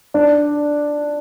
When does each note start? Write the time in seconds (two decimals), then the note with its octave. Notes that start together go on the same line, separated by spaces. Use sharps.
0.14 D4 D5